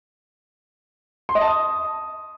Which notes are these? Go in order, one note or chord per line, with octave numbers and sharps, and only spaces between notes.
C6
D#5
A5
D#6